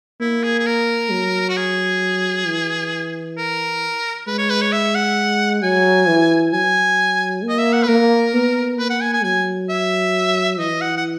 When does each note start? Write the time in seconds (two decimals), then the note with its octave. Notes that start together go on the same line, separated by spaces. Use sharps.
0.21 A#3 E4
0.44 G#4
0.60 G#4
0.67 A#4
1.11 F#3
1.49 F#4
1.57 G#4
2.47 E3
3.38 A#4
4.27 G#3 B4
4.38 C#5
4.50 B4
4.62 C#5
4.72 E5
4.95 F#5
5.62 F#3 G#5
6.08 E3
6.53 F#3 G#5
7.44 A#3
7.49 D#5
7.59 E5
7.73 F#5
7.83 B4
7.89 A#3 A#4
8.34 B3
8.79 A#3 B4
8.90 F#5
9.01 G#5
9.13 G#5
9.24 F#3 G#5
9.70 E5
10.59 E3 D#5
10.82 F#5
10.97 F#5